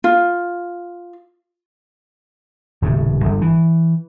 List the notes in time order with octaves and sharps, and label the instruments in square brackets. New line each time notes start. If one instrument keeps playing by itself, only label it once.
[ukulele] F4
[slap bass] D#1 A2 C#3
G1
E3